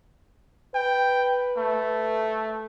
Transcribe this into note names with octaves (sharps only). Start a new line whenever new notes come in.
B4 G5
A3